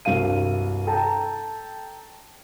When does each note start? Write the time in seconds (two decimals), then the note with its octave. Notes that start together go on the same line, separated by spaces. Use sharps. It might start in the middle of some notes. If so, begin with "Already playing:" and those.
0.05 C2 G2 F#4 F5 D#7
0.87 A4 G5 A5 A#5